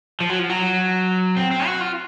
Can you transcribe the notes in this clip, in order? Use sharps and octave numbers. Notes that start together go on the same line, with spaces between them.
F3
F#3
F3
F#3
C4
C4
F#4
F4